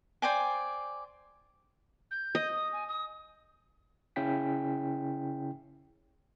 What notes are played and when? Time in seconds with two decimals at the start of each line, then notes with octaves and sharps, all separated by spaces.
0.22 C5 D5 G5 G#5
2.11 G6
2.35 D#5
2.53 D#6
2.72 G#5
2.88 D#6
4.16 C#3 C#4 E4 G5 B6